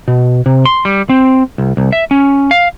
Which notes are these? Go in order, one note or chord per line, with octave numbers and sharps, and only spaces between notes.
B2
C3
C6
G3
C4
C2
C2
E5
C#4
F5